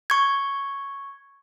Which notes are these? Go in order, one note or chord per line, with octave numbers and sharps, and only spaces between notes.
C#6 G#6